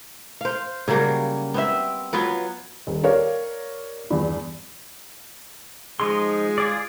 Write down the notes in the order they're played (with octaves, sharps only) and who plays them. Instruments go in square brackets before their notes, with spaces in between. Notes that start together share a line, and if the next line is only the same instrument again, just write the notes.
[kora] C5 F5
C#3 F#3 G3 A#3
B3 C4 E5
F#3 B3 F4 B4
[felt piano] D#1
G4 A#4 C#5 D5 F5
E2 G2
[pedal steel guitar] F3 D#4 C6 [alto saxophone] G#3
[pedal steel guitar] F4 G#4 D5